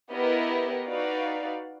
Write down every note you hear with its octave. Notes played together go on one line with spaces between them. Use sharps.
B3 E4 G4 A#4 D#5
D#4 F#4 B4 D5 F5